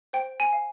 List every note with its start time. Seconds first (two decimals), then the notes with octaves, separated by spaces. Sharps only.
0.13 C5 G5
0.40 G#5
0.53 F5